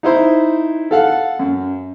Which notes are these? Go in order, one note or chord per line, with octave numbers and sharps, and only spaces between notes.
D#4 E4 C5
A4 F5 F#5
F#2